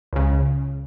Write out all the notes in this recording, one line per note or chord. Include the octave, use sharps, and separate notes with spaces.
C#2 C#3